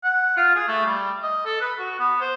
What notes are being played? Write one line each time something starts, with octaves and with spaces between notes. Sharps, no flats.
F#5
F4
G#4
A3
G3
D#5
A4
B4
F#4
B3
C5